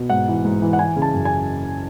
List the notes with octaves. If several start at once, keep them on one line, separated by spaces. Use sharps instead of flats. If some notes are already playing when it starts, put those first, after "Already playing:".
Already playing: B2
G#2 F#5
E3
G#2
E3
F#5
E3 G#5
C#3
A5
F#2
G#5